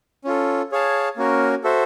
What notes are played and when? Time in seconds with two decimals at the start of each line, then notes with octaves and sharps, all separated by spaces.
0.24 C#4 F4 A4
0.72 G#4 C#5 F5 A5
1.17 A#3 C#4 F#4 A#4
1.64 F#4 A4 C5 E5